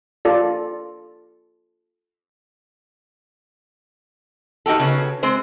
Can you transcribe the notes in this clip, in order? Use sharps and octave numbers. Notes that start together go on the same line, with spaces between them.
F4 A4 D5
A#3 D#4 F#4 G4 A4
C#3 B3 C#4 F#4
G#3 C4 C5